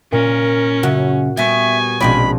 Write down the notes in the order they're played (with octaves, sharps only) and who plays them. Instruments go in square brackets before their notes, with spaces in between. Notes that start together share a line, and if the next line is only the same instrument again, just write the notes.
[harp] A#2 [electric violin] C#4 [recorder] A#4
[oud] F#2 C#3 [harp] F#4
[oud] G3 B3 [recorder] E5 [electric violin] G#5 [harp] C#6 A#6
[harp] A#1 C4 F4 [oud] B2 G#3 D5 [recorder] B5